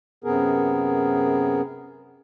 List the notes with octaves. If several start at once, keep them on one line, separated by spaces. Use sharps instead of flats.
F#2 C3 B3 G#4 A#4